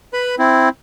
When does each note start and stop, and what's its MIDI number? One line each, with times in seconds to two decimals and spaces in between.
0.14 0.35 71
0.14 0.35 83
0.39 0.69 60
0.39 0.69 64